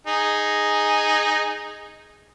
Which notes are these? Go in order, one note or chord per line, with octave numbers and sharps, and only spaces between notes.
D#4 G#4